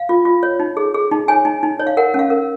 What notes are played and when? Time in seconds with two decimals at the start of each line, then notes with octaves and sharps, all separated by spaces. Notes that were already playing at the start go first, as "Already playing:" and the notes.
Already playing: F5
0.09 F4
0.25 F4
0.43 C#5
0.60 D#4
0.77 G#4
0.94 G#4
1.11 D#4
1.28 C#5 G#5
1.45 D#4
1.63 D#4
1.79 C#5
1.87 F5
1.97 A#4 F#5
2.14 C#4 F5
2.30 A#4